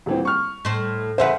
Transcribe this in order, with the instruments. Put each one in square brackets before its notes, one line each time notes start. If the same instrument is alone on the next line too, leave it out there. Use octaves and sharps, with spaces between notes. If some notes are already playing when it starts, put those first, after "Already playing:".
[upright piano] D#1 E3 C4
C#6 F6
[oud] A2 C5
[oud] E2 C#3 B4 [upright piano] C5 E5 F#5